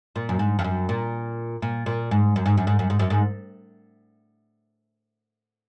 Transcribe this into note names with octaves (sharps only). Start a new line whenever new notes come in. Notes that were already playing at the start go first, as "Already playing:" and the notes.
A#2
F#2
G#2
F2
F#2
A#2
A#2
A#2
G#2
F#2
G#2
F#2
G#2
F#2
G#2
F#2
G#2